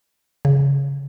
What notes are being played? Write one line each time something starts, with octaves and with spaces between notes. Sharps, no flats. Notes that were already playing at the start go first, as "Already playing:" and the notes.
C#3